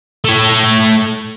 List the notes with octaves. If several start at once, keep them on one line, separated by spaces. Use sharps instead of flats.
A3 C#5